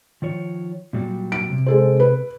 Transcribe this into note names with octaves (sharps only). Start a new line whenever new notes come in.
D#3 F3 C#5
A#2 F#3 G3
D7
C3
G#3 A4 C5
B4